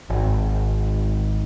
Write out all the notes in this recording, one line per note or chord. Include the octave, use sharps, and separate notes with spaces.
G#1